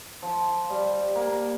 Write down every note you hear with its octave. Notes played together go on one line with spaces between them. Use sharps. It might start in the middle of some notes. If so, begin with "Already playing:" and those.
F3
G3
A#3